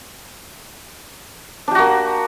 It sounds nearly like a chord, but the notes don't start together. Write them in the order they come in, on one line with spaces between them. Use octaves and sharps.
D4 G4 F#4 A#3